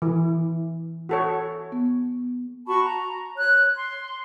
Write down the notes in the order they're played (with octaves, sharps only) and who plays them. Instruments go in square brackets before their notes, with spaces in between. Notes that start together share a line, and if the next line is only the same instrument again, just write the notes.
[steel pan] E3
F#4 A4 C#5
[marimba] B3
[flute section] F#4 A5 B5 C#6
A#5
C#5 F#6
C6